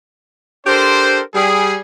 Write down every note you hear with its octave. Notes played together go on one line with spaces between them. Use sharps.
D4 G4 A4 A#4 C5
G3 G#4